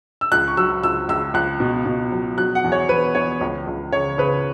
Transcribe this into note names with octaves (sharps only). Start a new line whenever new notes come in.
E6
C#2 F#6
C#6
F#3 E6
C#2 E6
C#2 E6
C#2 F#6
B2
B2
F#3
F#3 F#6
F#5
E2
C#5
E2 B4
E2 C#5
C#2
C#2
C#3 C#5
C#3 B4